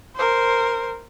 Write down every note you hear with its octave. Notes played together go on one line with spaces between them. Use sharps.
A#4 C5